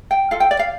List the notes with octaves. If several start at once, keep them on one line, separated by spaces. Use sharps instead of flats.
G5
F4 A4 F5
G5
D5
F5